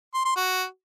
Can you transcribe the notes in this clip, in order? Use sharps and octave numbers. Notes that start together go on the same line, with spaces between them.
C6
C6
F#4